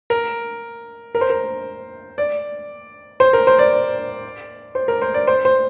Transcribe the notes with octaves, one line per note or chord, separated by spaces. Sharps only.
A#4
A#4
C5
A#4
D5
C5
A#4
C5
D5
C5
A#4
C5
D5
C5
C5